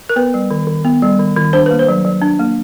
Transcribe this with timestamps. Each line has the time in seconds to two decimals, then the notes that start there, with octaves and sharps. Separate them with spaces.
0.09 A#4
0.16 B3 B4
0.34 G3
0.51 D#3
0.67 D#3
0.85 B3
1.02 G3
1.19 D#3
1.37 D#3
1.53 D4 C5
1.66 A#3 B4
1.79 C5
1.88 F#3
2.05 F#3
2.22 D4
2.40 A#3